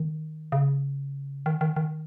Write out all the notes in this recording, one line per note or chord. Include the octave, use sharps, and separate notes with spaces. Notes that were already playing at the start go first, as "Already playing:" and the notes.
Already playing: D#3
C#3
D#3
D#3
D#3